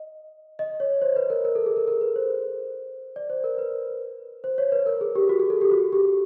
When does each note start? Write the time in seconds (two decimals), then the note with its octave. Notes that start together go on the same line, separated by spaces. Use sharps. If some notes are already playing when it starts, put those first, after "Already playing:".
Already playing: D#5
0.59 D#5
0.80 C#5
1.02 C5
1.16 B4
1.30 A#4
1.45 A#4
1.55 A4
1.66 G#4
1.77 A#4
1.87 A#4
2.01 B4
2.16 C5
3.16 D5
3.30 C5
3.44 A#4
3.58 B4
4.44 C5
4.58 C#5
4.72 B4
4.86 A#4
5.01 G#4
5.15 G4
5.29 F#4
5.39 G#4
5.50 A4
5.61 G4
5.71 F#4
5.93 G4